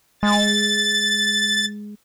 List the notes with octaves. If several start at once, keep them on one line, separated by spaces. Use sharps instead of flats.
G#3 A6